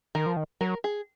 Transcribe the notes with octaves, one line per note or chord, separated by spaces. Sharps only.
D#3 A#4
F3
D#3
F#3 A#4
G#4